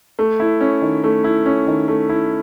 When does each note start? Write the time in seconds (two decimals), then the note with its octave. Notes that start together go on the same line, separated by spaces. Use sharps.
0.19 A3
0.40 E4
0.61 C#4
0.82 D#3
1.04 A3
1.24 E4
1.46 C#4
1.67 D#3
1.88 A3
2.09 E4